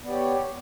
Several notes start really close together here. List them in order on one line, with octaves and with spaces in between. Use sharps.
B3 D5 G4 C#5